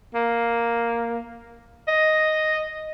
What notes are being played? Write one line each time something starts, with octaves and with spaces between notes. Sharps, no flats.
A#3
D#5